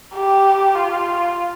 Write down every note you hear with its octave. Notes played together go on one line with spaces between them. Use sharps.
G4
F4